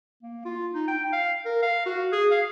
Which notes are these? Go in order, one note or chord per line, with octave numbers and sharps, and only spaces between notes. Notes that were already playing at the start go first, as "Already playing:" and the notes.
A#3
F4
D#4
G5
F5
A#4
F5
F#4
G#4
F5